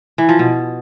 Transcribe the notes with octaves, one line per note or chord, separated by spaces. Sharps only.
E3
F3
B2